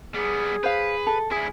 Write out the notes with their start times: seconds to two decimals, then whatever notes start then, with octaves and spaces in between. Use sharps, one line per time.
0.15 G3 B3 G#4
0.63 B4 C5 F5
1.07 A4
1.31 D2 E4 G#4